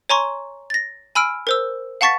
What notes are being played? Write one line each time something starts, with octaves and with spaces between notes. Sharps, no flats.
C#5 G#5 A#5 C6 C#6
A6 A#6
G#5 B5 E6 F6 D7
A#4 C5 E6
F5 F#5 A5 C#6 A6 B6